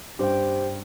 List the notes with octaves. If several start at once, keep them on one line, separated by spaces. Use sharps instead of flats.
G2 G4 C5 G5